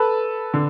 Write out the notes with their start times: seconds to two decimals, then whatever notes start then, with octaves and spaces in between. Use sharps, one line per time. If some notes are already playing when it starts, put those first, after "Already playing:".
Already playing: A4 B4
0.54 D3